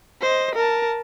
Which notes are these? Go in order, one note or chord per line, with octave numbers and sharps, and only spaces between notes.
C5 D#5
A#4 A5